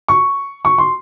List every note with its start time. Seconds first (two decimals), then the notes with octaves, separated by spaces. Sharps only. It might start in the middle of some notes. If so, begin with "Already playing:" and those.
0.08 C#6
0.65 C#6
0.78 C6